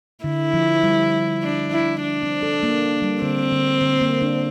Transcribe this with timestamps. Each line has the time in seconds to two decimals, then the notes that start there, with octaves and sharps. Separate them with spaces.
0.24 D3 E4
0.54 F3
0.83 G3
1.43 D4
1.72 E4
2.03 D4
2.23 C4
2.43 A4
2.63 A#3
3.02 G3
3.22 D3 C4
3.52 D3
3.81 D3
4.01 A#3
4.22 D4